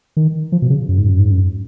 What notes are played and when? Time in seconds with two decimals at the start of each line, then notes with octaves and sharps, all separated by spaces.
0.17 D#3
0.52 F3
0.62 B2
0.70 C#3
0.89 F#2
0.98 G#2
1.09 F#2
1.20 G#2
1.31 F#2